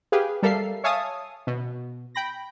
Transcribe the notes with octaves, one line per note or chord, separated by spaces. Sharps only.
G4 G#4 B4 F5
G3 A4 A#4 E5 F5 C7
C#5 E5 F5 G#5 A5 D#6
B2
G5 B5 A#6